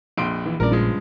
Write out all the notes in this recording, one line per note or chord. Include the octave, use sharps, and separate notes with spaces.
A#1 F2 C6 D7
E3
A#1 G2 A#2 C#3 A#4 D5
F3 G#3